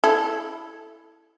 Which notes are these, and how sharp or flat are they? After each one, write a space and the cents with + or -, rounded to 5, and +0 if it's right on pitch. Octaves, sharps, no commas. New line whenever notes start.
E4 +0 A4 +0